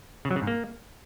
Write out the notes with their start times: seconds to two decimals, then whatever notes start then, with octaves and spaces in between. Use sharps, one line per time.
0.25 C#3
0.31 F#3
0.36 C#3
0.42 G#2
0.47 A#3